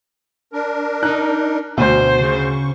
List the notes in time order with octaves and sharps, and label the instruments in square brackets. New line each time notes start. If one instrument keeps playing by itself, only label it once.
[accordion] D4 A#4
[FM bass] D#4 [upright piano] F#6
[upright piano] D2 [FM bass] B2 [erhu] C5
[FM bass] C#3 [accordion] C#6